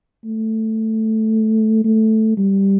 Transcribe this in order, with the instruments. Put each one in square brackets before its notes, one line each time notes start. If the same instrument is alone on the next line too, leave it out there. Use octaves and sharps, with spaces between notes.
[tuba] A3
A3
G3